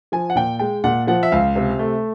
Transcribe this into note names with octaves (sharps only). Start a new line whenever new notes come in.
F3 G#5
F#5
A#2 G5
G#3 G5
A#2 F#5
F3 F#5
E5
C#2 F5
C3
A3